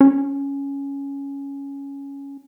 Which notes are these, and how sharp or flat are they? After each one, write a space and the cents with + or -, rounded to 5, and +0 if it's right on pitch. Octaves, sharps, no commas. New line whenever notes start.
C#4 +5